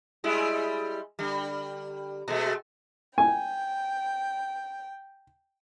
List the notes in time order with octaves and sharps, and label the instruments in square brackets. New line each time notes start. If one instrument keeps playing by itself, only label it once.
[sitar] G3 G#3 E4
D3 G3
B2 G#3 A3
[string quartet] G5 [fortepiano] G#5